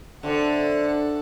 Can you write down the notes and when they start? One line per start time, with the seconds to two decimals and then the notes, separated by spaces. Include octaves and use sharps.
0.23 D3 A3 C4 A4 D5 F#5